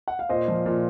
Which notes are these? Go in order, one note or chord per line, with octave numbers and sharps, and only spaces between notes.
F#5
F5
A#2 C5 D#5
F3
A#2